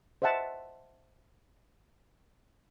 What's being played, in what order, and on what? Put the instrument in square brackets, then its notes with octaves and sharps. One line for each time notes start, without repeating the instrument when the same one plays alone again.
[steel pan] C5 D#5 E5 F#5 A5